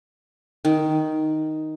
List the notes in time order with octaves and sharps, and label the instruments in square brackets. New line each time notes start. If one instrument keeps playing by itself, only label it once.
[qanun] D#3